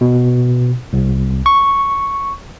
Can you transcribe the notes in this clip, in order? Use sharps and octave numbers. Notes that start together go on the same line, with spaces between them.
B2
C2
C#6